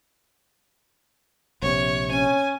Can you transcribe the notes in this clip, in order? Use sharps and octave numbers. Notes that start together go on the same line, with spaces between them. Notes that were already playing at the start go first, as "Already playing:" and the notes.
A#1 C3 C#5
C#4 G#5